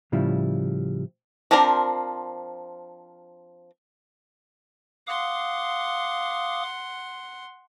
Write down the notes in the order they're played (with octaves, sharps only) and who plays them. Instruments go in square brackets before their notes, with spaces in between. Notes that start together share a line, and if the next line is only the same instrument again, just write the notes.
[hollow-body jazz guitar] A2 C#3 F3 G3 E4
[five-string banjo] F3 C4 D4 A#4 C5
[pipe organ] F5 D6 D#6 [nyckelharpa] F#5 C6